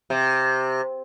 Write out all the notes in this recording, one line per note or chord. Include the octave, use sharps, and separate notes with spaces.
C3